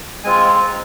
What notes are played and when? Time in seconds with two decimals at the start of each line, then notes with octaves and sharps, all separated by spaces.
0.24 G#3 C4 F4 G#5
0.50 A#5